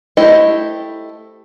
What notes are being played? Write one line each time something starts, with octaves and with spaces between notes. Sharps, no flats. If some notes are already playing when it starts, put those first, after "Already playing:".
A3 E4 G4 C5 D#5